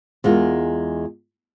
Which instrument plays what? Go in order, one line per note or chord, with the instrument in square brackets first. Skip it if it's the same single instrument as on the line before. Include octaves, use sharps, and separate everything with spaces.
[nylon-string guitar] E2 G#3 F4 A#4